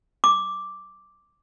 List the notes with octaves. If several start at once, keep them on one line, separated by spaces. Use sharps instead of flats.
D6